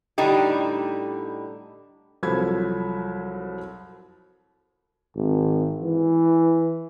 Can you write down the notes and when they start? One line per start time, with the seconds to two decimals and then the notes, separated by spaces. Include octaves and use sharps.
0.18 A2 D3 G3 D4 D#4 G4
2.23 C2 F3 F#3 A4 B5 G#6
5.15 G#1
5.81 E3